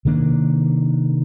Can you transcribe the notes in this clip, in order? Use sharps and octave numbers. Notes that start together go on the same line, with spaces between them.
C3 D#3 A#3 D4